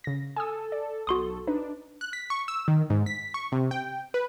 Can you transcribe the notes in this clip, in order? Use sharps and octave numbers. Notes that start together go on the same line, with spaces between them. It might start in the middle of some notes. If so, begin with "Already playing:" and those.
C#3 A#6
A4 G#5 D#6 E6
D5
B1 F#4 A4 C6 D#6
D4 D#4 B4
F#6
B6
C#6
E6
D#3
G#2
B6
C#6
C3
G5
B4